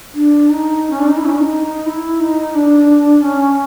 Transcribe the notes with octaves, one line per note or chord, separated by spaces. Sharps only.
D4
D#4
C#4
D4
D#4
E4
C#4
D4
D#4
D#4
E4
D#4
D4
C#4